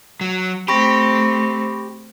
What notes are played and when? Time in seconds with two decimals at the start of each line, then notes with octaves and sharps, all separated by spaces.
0.21 F#3
0.68 A3 C4 G4 B5 C#6 A#6